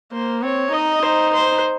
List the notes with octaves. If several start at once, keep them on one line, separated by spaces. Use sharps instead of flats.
A#3 C5
C4 C#5
D#4 D#5
D#4 C5
C5